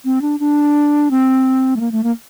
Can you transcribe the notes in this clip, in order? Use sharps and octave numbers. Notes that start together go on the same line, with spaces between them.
C4
D4
D4
C4
A3
A#3
A3
A#3